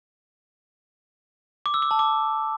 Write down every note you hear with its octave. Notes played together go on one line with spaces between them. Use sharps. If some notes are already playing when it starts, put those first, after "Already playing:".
D6
E6
D6
A5
D6